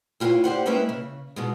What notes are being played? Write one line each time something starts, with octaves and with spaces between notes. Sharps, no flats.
E4 F4 G4 A#4 B4 C#5
D4 G4 C5 F#5
G#3 A#3 C#4 E4 B4 E5
C#3
G#2 B2 G#3